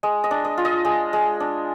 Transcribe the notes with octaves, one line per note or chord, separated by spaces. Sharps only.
G#3 D#5
D#5
D4
D#5
F4
D#5
G#3
G#3
D4